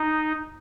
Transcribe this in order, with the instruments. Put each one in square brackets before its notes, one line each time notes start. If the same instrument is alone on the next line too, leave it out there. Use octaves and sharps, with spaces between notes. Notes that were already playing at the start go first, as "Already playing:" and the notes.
Already playing: [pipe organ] D#4